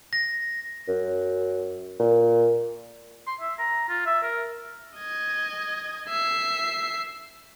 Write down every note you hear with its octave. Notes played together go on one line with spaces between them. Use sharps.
A#6
F#2
A#2
C6
E5
A#5
F4
E5
A#4
D#5 G#6
E5 C7